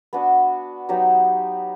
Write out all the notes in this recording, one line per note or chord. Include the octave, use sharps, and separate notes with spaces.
B3 D4 F#4 B4
F#3 B3 D#4 G4